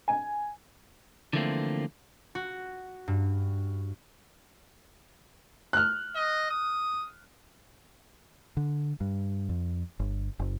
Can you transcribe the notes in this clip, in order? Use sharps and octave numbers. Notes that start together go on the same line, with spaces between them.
G#5
D3 E3 F3 A3 A#3 C4
F#4
G2
F6 F#6
D#5
D#6
D3
G2
F2
G1
F#1